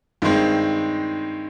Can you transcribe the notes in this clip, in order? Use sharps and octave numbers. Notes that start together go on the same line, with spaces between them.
G2 D#3 G#3 C4